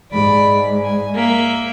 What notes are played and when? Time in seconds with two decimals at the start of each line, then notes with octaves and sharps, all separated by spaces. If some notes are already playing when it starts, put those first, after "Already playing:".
0.12 G#2 G#3 D5 B5
0.83 G#5
1.15 A#3 E5